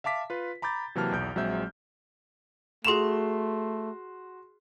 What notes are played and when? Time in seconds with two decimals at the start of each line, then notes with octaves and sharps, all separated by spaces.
0.04 E5 F5 A5 D6 B6
0.30 F4 B4
0.62 A#5 B5 D6 G6 A6
0.95 C3 E3 F#3 A#3 A5 F6
1.12 B1 E2 G6 D7
1.35 A#1 F#3 G#3 C4 E5 G6
2.85 A3 F#4 G#4 C6 E7 F7